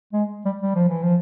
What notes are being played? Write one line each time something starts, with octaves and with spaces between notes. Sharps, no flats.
G#3
G3
G3
F3
E3
F3